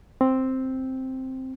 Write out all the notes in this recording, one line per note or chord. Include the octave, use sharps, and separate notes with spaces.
C4